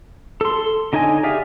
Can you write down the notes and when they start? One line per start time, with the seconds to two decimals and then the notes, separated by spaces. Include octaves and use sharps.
0.41 A4 C6
0.93 D3 D#4 C#5 D#5 G#5
1.23 G4 G#4 D5 E5 F5